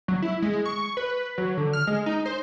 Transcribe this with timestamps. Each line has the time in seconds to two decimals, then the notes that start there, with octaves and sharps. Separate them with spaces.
0.08 F#3
0.22 E4
0.42 G#3
0.66 C#6
0.97 B4
1.38 F#3
1.57 D3
1.73 F6
1.87 G#3
2.06 D#4
2.26 C5